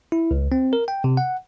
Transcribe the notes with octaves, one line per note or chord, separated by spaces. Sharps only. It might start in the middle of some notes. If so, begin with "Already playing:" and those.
E4
C#2
C4
A#4
G5
C3
F#5